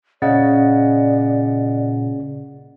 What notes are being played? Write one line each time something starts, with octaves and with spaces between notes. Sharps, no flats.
A#2 C#3 D5 D#5 F#5 A6